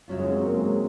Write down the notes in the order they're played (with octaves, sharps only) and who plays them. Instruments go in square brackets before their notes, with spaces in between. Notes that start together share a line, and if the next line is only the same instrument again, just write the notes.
[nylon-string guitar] F#2 C#3 F#3 C#4 F4
[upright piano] G#3
C4
A#3
G#3